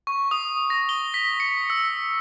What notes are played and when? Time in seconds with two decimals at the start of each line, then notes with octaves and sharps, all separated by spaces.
0.07 C#6
0.31 D#6
0.70 A#6
0.89 G7
1.14 B6
1.40 C#7
1.70 E6